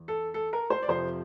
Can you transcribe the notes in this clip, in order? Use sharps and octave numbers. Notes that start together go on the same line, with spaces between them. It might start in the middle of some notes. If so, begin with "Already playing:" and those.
Already playing: E2
A4
A4
A#4
C5
D5
F2 C3 F3 C5